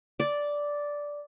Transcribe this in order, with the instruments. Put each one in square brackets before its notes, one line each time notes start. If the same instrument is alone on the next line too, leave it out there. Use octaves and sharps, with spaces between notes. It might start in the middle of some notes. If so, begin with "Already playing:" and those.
[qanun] D5